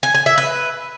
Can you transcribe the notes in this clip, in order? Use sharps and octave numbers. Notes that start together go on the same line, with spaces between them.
G#5
G#5
E5
B4